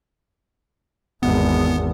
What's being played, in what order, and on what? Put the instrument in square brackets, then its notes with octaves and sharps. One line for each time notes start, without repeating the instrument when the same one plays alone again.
[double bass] G#1 E2 [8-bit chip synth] B3